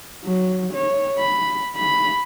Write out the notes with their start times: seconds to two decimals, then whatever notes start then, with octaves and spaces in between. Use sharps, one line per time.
0.25 F#3
0.73 C#5
1.18 B5
1.76 B5